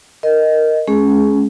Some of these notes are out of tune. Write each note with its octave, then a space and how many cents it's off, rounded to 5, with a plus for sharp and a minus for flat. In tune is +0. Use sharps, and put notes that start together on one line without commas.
A#4 +0 D#5 +0
G#3 +30 C#4 +0 G#4 +15